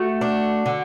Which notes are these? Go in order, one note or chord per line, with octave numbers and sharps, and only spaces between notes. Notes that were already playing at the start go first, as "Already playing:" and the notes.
Already playing: A3 F#4
D4
D3